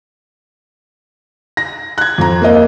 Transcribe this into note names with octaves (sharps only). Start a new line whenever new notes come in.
A#6
F#6 G#6
F2 A#5
A#3 A#4 D#5 F5